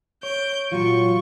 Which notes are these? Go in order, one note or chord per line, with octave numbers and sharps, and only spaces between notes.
C#5 G6 D7
A#2 E3 F#3 F4 C#6